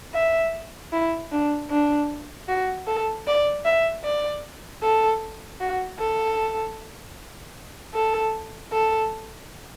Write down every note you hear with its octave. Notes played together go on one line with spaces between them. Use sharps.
E5
E4
D4
D4
F#4
A4
D5
E5
D5
A4
F#4
A4
A4
A4